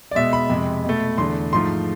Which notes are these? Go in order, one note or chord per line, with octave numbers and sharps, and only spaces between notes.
D5
B2 G#3 E5
B5
F2 C3 G#3
B2
A3
E2 D3 A3 C6
G#2 F3 A3 C6